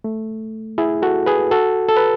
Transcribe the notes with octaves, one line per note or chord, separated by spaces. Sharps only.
A3
E4 G#4
F#4 A4
G#4 B4
F#4 A4
A4
B4